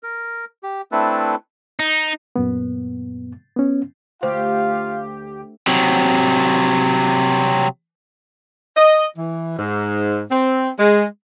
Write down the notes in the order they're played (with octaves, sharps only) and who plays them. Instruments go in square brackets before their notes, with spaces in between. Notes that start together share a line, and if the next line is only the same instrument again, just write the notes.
[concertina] A#4
G4
A3 C4 D4 E4 A4 B4
[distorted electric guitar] D#4
[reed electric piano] F#2 A#2 B3
B3 C#4
[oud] D2 [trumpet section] F4 F5 [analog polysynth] G4 [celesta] C5
[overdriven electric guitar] C3 F#3
[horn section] D#5
E3
G#2
C4
G#3